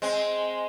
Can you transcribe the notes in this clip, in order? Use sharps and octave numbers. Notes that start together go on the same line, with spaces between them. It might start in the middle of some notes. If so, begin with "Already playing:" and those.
G#3 C4